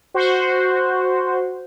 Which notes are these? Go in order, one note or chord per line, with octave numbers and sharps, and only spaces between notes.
F#4 C5